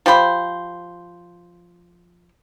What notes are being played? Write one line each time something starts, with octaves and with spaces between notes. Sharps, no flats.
F3 G4 C5 B5